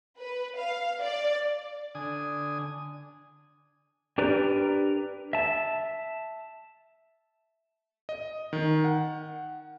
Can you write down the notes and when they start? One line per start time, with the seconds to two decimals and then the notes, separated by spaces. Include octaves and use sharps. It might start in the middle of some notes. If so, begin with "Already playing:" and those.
0.19 B4
0.58 F5
1.02 D5
1.95 D3 G#5 D#6
4.18 D4 G4 A#4 B4 D5
5.33 E5 A5
8.09 D#5
8.53 D#3
8.84 F#5